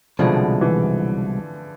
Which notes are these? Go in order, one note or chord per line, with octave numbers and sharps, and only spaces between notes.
C2 B2 D3 F3 G#3
E3